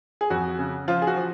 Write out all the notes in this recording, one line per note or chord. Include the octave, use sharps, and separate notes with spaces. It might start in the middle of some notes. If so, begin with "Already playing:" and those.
G#4
F2 F#4
C#3
F3 F4
G#4
F#4
F3